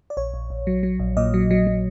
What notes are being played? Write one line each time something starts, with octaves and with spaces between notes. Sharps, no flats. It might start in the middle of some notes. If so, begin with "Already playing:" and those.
D5
A#1 C#5
A#1
A#1
F#3
F#3
A#1
A#2 D#5
F#3
F#3
F#3